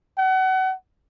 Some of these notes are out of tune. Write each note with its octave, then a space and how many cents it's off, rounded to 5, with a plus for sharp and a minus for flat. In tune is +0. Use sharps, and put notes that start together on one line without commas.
F#5 +30